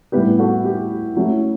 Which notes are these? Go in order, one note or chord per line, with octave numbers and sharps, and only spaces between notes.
A2 G3 B3 E4 G4 B4
F#4 A4
G4
F#3 A3 C#4 E4